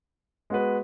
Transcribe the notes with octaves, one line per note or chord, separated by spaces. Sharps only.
G#3 B3 F#4 B4